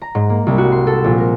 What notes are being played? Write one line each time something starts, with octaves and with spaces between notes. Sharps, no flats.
A#5
G#2
A#3
C2
F#4
C6
A4
A#1
A#4